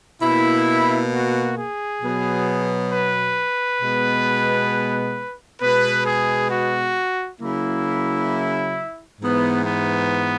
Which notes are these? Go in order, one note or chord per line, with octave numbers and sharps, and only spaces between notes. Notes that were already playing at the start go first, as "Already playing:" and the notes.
B2 A#3 E4
F#4
G#4
B2 F#3 B3
B4
B2 G#3 B3
B2 G#3 B3 B4
G#4
F#4
C#3 F#3 A#3 E4
G#2 E3 B3
B3